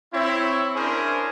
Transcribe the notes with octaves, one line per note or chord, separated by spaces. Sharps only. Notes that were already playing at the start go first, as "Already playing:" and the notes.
C4 E4 C#5
C#4 D4 E4 G#4 A#4 C5